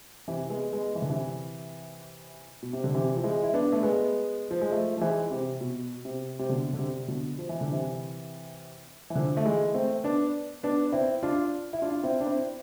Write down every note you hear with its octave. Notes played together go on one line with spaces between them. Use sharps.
C3 E3
G#3 B3
G#3 B3
E3
D3
C3 E3
B2
C3
D3
C3 E3
F3
E3 G#3
E4
B3 D4
A3
G#3 B3
F3
G#3
F3 A3
F3
E3 G#3
C3
B2
C3
C3
B2 D3
D3
C3
B2 D3
F3
E3
D3
C3 E3
E3
D3 F3
A3
E3 G#3
A3 C4
B3 D4
B3 D4
C4 E4
D4 F4
E4
D4 F4
C4 E4
D4
C4 E4